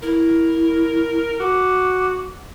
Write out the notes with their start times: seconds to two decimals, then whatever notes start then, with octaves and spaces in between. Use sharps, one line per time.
0.03 E4 A#4
1.40 F#4 D6